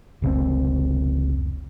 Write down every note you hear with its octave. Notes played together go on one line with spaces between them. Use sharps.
F1 C#2 G#2 C4